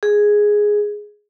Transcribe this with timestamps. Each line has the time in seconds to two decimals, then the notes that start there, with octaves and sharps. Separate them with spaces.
0.03 G#4